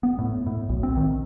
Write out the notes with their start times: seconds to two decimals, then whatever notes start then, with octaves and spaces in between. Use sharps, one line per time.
0.03 B3
0.19 A2
0.47 A2
0.69 B1
0.83 C4
0.97 D#3